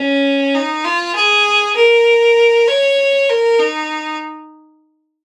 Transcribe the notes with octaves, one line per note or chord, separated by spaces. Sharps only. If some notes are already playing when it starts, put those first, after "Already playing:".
Already playing: C#4
D#4
F4
G#4
A#4
C#5
A#4
D#4